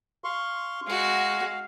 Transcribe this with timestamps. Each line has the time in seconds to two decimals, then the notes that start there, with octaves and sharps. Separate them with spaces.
0.24 F5 C6 C#6
0.87 G#3 F#4 F5